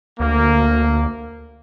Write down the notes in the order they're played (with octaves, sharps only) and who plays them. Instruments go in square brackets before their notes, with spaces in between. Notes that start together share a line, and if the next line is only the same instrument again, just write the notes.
[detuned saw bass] D2 [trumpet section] A#3